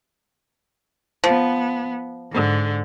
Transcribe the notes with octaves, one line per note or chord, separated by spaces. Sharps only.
F3 B3
G#2 D3